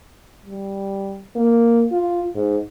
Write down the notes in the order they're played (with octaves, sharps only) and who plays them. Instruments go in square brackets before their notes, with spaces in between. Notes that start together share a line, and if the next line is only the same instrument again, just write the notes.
[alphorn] G3
A#3
F4
G#2